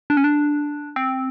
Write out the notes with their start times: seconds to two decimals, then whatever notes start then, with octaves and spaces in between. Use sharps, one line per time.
0.10 D4
0.17 C#4
0.24 D4
0.96 C4